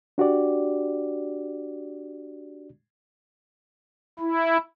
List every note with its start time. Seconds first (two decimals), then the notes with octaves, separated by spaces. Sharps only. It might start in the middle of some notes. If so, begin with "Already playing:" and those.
0.18 D4 F#4 G4 D5
4.19 E4